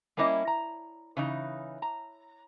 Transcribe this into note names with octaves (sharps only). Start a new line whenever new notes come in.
G3 A#3 C#4 E4 D#5
A#5
C#3 E3 D#4
A#5